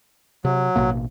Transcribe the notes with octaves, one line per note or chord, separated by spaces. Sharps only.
C3 F#3
A1 B2 A#3